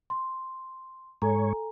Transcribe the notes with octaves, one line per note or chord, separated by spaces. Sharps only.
C6
G#2 A4 C#5 G#5 A#5